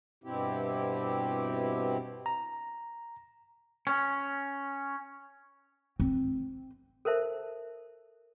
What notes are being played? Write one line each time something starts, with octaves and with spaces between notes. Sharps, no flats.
G2 B2 C4 E4 G4
A#5
C#4
C4
A4 A#4 C5 E5 A5